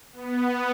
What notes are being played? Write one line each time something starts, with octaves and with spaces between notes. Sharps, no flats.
B3